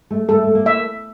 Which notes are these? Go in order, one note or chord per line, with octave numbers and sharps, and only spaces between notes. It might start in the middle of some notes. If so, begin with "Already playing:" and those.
A3
A3 A4
A3
A#3
E5